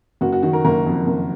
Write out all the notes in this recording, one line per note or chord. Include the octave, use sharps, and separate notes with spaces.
F#1 F#4
F#4
D#3 F#4
A#4
F#1 A#4
F2
F#1